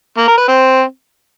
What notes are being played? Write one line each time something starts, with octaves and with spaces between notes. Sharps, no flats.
A#3
A#4
B4
C4